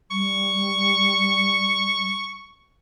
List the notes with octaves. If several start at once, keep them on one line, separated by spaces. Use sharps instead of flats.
G3 C#6